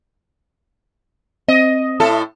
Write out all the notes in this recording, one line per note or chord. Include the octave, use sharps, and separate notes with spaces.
C4 D#5
A2 E4 A4